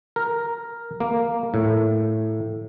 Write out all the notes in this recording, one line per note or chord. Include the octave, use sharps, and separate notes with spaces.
A#4
A#3
A2